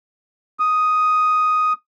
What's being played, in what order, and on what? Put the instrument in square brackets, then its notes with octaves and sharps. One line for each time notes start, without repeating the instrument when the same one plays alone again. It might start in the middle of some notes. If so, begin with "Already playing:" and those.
[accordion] D#6